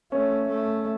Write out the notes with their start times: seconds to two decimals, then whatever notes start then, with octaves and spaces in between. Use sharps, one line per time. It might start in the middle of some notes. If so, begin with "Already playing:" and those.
0.12 A3 C#4
0.49 A3